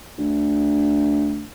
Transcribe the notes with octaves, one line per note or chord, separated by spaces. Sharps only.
D2